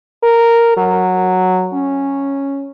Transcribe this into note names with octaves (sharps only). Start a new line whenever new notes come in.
A#4
F#3
C#4